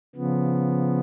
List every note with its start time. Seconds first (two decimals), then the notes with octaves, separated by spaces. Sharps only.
0.15 C#3 F3 B3